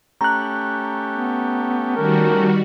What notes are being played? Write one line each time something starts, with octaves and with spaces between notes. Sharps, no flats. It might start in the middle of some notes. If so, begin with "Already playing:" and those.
A3 C#4 G4 A#5 F#6
B3
D#3 G3 F#4 A#4